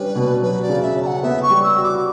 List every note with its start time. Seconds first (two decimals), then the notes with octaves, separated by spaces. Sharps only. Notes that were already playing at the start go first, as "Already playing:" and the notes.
Already playing: G3 C#4 D4 B4
0.15 B2
0.42 F#3 B4
0.62 D5
0.69 C#3
0.82 E5
0.96 C#4
1.02 A#5
1.06 F#5
1.23 B3 E5
1.43 C#6
1.50 G3
1.63 E6
1.76 F#4
1.83 D6